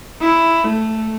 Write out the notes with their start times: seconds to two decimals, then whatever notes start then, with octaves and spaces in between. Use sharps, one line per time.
0.22 E4
0.68 A3